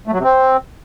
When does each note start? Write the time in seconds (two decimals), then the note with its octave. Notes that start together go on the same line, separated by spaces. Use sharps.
0.07 A3
0.13 F#3
0.18 C3
0.24 C4